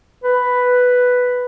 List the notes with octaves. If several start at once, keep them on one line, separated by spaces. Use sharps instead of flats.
B4